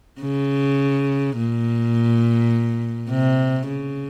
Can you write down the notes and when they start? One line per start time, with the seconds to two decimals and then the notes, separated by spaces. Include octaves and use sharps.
0.21 C#3
1.37 A#2
3.10 C3
3.67 C#3